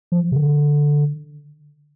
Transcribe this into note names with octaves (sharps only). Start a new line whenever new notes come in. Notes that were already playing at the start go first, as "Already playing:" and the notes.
F3
C3
D3